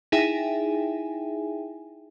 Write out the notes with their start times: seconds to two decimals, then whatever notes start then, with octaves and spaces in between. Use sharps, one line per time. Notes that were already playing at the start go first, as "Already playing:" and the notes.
0.12 D#4 E4 G#4 E5 G5 G#5